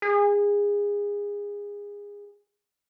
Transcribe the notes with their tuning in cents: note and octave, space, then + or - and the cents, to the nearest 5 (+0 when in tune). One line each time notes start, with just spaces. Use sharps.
G#4 -25